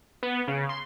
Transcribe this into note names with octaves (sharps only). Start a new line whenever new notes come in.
B3
C#3
C6